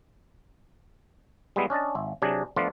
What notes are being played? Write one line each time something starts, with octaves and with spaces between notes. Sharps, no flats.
G3 G#3 B3 E4
C#4 D4 D#5 A5
G#1 E5
C3 F#3 D4 G#4
F3 A3 B3 D4 F4